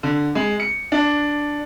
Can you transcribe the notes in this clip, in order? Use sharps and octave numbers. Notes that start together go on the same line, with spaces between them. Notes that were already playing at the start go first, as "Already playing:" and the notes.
D3
G#3
C#7
D4